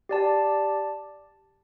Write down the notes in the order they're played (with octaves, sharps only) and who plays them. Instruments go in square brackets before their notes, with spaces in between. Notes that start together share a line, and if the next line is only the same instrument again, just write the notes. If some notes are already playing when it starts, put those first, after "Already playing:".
[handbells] G4 D5 A5